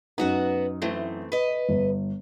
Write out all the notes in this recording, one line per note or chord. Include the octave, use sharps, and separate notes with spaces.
F#2 B3 D#4 F#4 F#5
E3 A3 C4
B4 D#5
G1